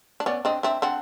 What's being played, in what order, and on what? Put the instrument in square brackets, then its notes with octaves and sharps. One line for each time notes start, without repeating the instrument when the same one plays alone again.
[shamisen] D4
[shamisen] B3 C#4 [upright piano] D5
[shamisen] C4 D4 [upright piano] D#5
[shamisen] C4 D4 [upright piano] E5
[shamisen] C4 D4 [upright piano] F#5